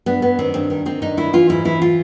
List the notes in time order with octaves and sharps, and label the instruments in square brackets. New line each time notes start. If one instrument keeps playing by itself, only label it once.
[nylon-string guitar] G2 B3
G2 B3
D#3 C4
G2 C4
D#3
D#3 C4
G2 D#4
D#3 E4
E3 F4
G#2 E4
E3 E4
F4